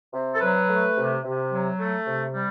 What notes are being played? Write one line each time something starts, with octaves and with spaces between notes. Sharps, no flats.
C3
A4
F#3 B4
A3
C3
C3
F#3
A3
C3
G3